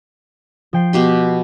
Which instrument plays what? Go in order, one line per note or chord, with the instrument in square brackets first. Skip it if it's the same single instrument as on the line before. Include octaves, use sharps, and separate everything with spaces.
[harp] F3 G5 C7
[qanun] B2 G4 C6